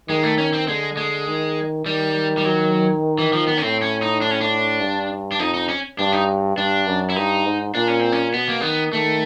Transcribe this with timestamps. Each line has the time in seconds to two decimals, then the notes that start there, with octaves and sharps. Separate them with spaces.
0.09 D#3 G#3
0.23 A3
0.38 C#4
0.53 C4
0.67 D3 G#3
0.97 G#3
1.27 D#3
1.85 D#3 G3
2.37 G3
2.45 F#3
3.18 E3
3.33 F3
3.48 B3
3.57 C#4
3.62 A2 C4
3.82 C#4
4.02 D#4
4.22 D4
4.31 C#4
4.41 D4
4.81 G2
5.32 D4
5.39 F2 D#4
5.54 D#4
5.69 C#4
5.99 G2 D4
6.12 D#4
6.57 G2 D4
6.87 F#2
7.10 E4
7.16 G2 D#4
7.46 G#2
7.74 A#2 D4
7.88 C#4
8.00 C4
8.12 C#4
8.34 B2 B3
8.48 A#3
8.61 D#3 B3
8.93 D#3 A3